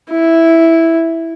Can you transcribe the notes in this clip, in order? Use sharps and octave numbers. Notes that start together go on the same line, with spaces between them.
E4